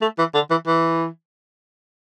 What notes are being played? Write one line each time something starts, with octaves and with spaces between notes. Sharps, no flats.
A3
E3
D3
E3
E3